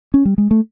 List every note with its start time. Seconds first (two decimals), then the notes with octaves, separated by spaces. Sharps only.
0.14 C#4
0.25 G3
0.38 G#3
0.51 A3